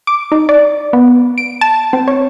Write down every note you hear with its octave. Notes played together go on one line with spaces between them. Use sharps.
D6
D#4
D5
B3
D7
A5
C4
C#5